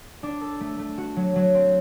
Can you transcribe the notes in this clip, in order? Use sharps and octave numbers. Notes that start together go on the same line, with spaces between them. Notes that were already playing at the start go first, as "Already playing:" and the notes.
D4
A4
A3
A3
F#4
F#3
F#3
C4